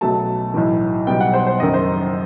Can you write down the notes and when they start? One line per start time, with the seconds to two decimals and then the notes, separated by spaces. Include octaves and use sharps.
0.01 B1 B2 F#3 A3 A5
0.54 B1 A2 E3
1.07 B1 B2 G3 B3 G5
1.20 F#5
1.33 C5
1.47 C5
1.60 F#1 F#2 D#3 D#5
1.74 C5